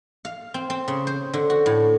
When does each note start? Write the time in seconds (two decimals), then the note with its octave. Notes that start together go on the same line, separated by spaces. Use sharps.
0.25 F5
0.54 C4
0.70 C4
0.88 C#3
1.07 C5
1.34 D3
1.50 F#4
1.66 A2